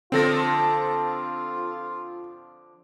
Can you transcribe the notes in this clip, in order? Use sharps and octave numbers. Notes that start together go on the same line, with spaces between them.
D3 F3 C4 F4 A4 A#6